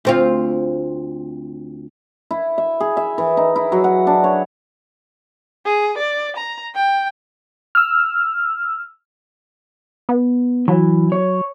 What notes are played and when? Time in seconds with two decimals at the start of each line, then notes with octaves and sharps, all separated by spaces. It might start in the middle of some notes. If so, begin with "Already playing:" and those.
0.05 D2 C4 F4
2.31 E4
2.58 E5
2.80 G#4
2.97 E5
3.18 E3
3.37 D#4
3.56 E4
3.72 F#3
3.84 F#5
4.07 D4
4.24 C#5
5.65 G#4
5.97 D5
6.36 A#5
6.75 G5
7.75 E6 F6
10.09 B3
10.68 E3 F#3
11.12 C#5